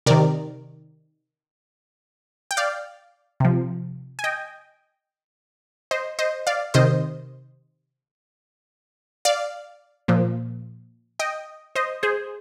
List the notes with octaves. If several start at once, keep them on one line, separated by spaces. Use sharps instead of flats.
C3 D#3 A#4 D5
G5
D5 F5
C3 F3
G#5
D#5 G5
C5 D#5
C5 D#5
D5 F5
C3 D#3 C5 D#5
D5 F5
A#2 F3
D#5 G5
C5 D#5
G#4 C5